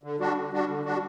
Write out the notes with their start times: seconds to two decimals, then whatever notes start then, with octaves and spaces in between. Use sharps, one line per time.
0.03 D3
0.20 G3 D4 F#4
0.36 D3
0.52 G3 D4 F#4
0.68 D3
0.85 G3 D4 F#4